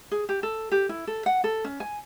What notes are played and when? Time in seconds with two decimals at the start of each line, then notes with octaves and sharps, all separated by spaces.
0.11 G#4
0.29 G4
0.43 A4
0.72 G4
0.89 E4
1.07 A4
1.26 F#5
1.44 A4
1.64 C#4
1.80 G#5